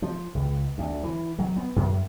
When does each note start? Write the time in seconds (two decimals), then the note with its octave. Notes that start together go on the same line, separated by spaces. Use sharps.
0.02 F3
0.35 C#2
0.78 D2
1.03 E3
1.39 F#3
1.57 B3
1.76 F#2